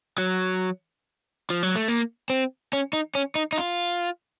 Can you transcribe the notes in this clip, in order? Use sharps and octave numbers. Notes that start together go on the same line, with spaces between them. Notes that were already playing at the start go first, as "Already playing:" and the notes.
F#3
F3
F#3
A3
A#3
C4
C#4
D#4
C#4
D#4
D#4
F4